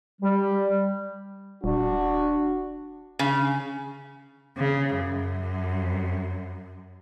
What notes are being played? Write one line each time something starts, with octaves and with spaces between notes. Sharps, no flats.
G3
D#1 D4 F#4
C#3
C#3
F#2